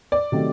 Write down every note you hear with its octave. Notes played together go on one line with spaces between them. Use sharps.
D5
C3 D#3 F#3 A3